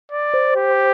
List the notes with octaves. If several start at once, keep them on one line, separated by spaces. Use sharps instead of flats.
D5
C5
G4